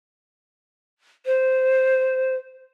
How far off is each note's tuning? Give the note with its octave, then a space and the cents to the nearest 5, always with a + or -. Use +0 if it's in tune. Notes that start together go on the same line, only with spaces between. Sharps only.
C5 -5